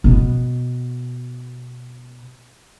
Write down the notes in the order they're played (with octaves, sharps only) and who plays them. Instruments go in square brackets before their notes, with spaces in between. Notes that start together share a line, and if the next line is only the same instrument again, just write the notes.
[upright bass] B2 B3